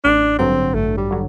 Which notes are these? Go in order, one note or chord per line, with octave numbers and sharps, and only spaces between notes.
A1 D4
G2 D3 F#3 C4
A1 A3
G3
D3 F#3